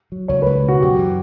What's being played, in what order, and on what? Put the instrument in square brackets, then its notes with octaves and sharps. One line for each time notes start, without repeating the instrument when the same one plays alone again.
[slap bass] F#3
[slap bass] C#2 [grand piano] C#5
[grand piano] B4
[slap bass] C#2
[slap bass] B2 [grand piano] F#4
[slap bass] F#2 [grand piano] G4
[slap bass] E3